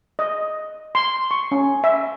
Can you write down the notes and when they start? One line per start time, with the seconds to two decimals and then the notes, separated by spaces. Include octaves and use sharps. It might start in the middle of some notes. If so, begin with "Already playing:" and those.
0.19 D#5
0.95 C6
1.31 C#6
1.52 C#4
1.84 E5